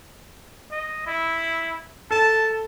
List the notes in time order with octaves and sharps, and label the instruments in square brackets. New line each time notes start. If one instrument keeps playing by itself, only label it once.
[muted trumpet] D#5
E4
[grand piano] A4 [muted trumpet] A5